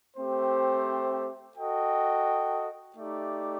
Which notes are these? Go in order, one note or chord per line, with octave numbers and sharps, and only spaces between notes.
A3 C4 G4 C5
F#4 A4 D#5 G5
A3 D#4 G4 D5